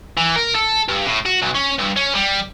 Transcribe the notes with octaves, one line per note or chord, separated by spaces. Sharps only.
E3
A#4
A4
G2
A2
F#4
B1
C#4
G2
C#4
G3